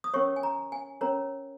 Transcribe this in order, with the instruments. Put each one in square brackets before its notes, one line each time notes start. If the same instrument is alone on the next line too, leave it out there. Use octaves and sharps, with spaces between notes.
[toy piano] D#6
C#4 A#4 C#5 C#6
G#5
A#5
G#5
C#4 A#4 C#5 A#5